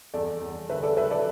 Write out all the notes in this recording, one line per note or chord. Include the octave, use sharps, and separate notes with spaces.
E2 A4 D5
E2
D3 B4 E5
A4 D5
F#3 B4 E5
A4 D5